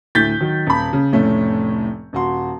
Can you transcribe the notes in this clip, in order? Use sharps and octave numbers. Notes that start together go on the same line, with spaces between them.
D2 A2 E4 G6 A6 B6
D#3 F#3
D#1 B5
C#3
F1 A2 A3 C#4
D#1 F#4 C6